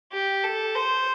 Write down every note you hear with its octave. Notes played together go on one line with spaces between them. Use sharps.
G4
A4
C5